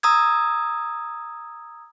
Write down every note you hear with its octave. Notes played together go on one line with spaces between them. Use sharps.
A#5 D#6 E6 G#6